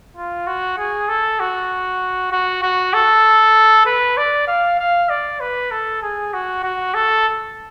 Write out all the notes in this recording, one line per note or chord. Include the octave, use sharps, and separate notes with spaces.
F4
F#4
G#4
A4
F#4
F#4
F#4
A4
B4
D5
F5
F5
D5
B4
A4
G#4
F#4
F#4
A4